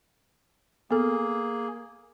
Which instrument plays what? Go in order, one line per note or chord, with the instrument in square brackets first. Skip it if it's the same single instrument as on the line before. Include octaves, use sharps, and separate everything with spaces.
[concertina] A#3 G#4 [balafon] B3 A4